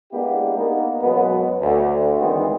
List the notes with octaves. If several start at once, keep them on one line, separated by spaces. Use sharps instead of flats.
G#3 A#3 B3 D4 E4 G4
A#3 B3 D#4
F#2 B2 F#3 G#3 B3
D2
D#3 E3 G#3 B3 C4